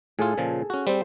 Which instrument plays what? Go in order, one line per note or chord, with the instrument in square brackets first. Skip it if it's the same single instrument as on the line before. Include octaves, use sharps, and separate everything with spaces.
[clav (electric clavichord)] A2 F4 [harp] G#4 A4
[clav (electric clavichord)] A#2 C#3 F3
C#4 F#4
[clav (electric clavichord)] G3 C4 [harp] C5